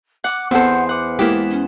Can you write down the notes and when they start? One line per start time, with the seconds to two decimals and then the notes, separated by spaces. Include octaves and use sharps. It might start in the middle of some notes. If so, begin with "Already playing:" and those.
0.24 F#5 D6
0.51 E2 C4 A4 C5 F#5
0.89 B4 F#5 D6 F#6
1.19 G#3 A#3 B3 E4 G4
1.50 C#4